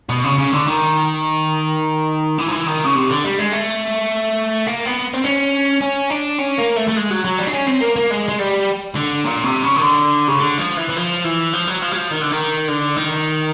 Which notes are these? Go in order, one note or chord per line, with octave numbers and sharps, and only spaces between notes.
B2
C#3
C#3
D3
D#3
E3
F3
E3
D#3
C#3
C3
D3
G3
G#3
A3
A#3
B3
C4
C#4
C#4
D4
C#4
A#3
A3
A3
G#3
F#3
F#3
G3
D4
C#4
C4
A#3
A#3
G#3
G#3
G3
D3
A#2
C3
C#3
D#3
D3
C#3
D3
F3
E3
E3
F3
E3
F3
F#3
F3
F#3
F3
D#3
D3
D#3
D3
D#3